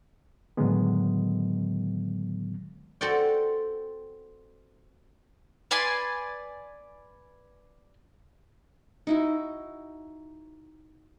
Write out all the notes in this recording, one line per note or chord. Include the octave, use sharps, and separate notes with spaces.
A2 D3 D#3 F#3 G#3 B3
C4 F#4 A4 D5 F#5 G5
B4 D5 G#5 C6
D#4 E4 F#4